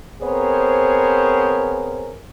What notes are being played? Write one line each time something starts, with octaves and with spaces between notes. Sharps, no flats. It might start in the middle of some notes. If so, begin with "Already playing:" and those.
B3 C4 G#4 A#4 C5 C#5